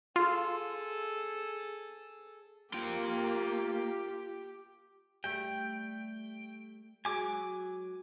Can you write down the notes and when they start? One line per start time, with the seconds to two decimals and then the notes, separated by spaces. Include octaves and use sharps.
0.16 F4 G#4 A4
2.74 A#3 F4 G4 G5
5.24 G3 A3 G5
7.05 F#3 G#3 G#5 D6